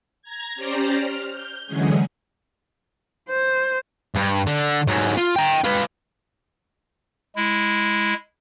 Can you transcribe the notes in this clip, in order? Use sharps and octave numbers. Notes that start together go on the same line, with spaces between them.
A#5 G#6
C#4 G4 C5 D5 A#5
F6
G6
D3 E3 F#3 G#3 C#4 G#4
C5
G2
D3
G#2 F#3
F4
G5 A#5
F4 B4
G#3 E4